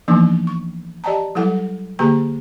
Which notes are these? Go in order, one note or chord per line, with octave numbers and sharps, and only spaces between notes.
E3 F3 A#3 B3 D4 D#4
C#6
G4 D5 D#5 G5 A5 A#5
F#3 G3 E4 A4 F#5
D3 A#3 G4 G#4 G5 A#5